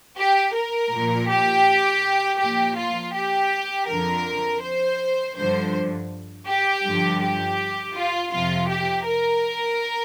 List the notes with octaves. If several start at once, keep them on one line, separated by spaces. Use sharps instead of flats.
G4
A#4
A#2 F3
G4
A#2 F3 G4
F4
G4
F2 D3 F3 A#4
C5
G2 D3 F3 C5
G4
G2 D3 F3
G4
F4
F2 C3 F3 F4
G4
A#4